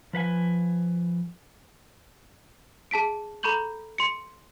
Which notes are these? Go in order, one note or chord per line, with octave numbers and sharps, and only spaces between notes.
F3 B4 F5 G#5
G#4 A5 B6 D7
A4 A#5 B5 C#6 G6 F#7
C6 C#7